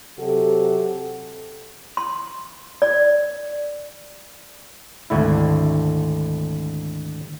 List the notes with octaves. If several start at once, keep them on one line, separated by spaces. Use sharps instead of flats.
C3 F#3 F#4 G4 A4
C6
D5
G#1 D2 D3 E4